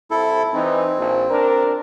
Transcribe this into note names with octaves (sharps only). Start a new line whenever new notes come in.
C2 E4 A4
E3 C4 D#4
A#1
D4 A#4